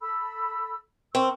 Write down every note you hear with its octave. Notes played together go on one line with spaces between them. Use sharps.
A4 B5 E6
C4 A#4 C#6 E6